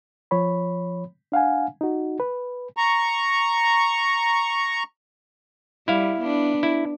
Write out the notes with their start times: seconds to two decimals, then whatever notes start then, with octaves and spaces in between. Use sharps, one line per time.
0.31 F3 C#5 B5
1.32 D4 F5 F#5 G#5
1.81 D#4 F#4
2.20 B4
2.76 A#5 C#6
5.88 G3 E4 F5
6.21 B3 D4
6.63 E4